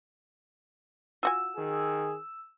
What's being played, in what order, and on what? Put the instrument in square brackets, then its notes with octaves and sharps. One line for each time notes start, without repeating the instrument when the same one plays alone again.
[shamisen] F4 F#4 G#5 [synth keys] E6
[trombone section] D#3 G#4